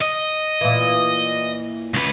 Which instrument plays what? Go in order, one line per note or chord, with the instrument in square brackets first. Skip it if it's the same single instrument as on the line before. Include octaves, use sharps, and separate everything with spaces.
[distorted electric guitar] D#5
[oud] A#2 E3
[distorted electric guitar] C#2 B4